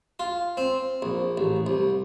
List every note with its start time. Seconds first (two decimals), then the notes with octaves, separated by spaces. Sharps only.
0.20 F4
0.57 C4
1.02 A#1
1.38 A1
1.67 C2